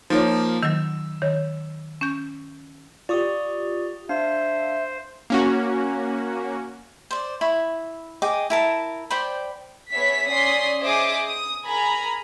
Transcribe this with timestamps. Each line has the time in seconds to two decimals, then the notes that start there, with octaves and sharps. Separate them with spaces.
0.10 F3 A#3 D#4 F4 C#5
0.63 D#3 F#3 E6
1.22 D#3 C#5
2.01 C#4 G6
3.09 F4 G4 D5 C#6 D#6
4.09 D4 C5 E5 F5
5.30 A#3 C#4 F#4
7.11 C5 D5
7.41 E4 B5 C#6
8.22 G#4 D#5 G5 D6
8.50 E4 A#4 A5
9.10 C5 D5 G5 B5
9.92 B3 G#4 C#5 E5 B6
10.30 C#4 D5 C6 D#6 B6 C7
10.81 G#4 C5 D#5 E5 D6 D#6
11.28 D#6
11.65 G#4 A#4 G#5 A#5 B5